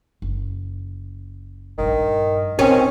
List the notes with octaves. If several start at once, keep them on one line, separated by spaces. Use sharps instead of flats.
F#1
A#1 G2 D#3
E1 D#3 C4 C#4